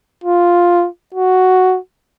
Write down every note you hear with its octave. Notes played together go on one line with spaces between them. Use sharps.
F4
F#4